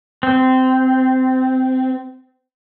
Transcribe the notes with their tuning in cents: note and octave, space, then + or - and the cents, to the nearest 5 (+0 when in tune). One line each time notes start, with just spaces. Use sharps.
C4 -15